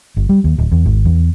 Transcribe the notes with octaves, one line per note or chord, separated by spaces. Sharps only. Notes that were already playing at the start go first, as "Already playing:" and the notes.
G1
G3
D#2
D1
E2
G#1
E2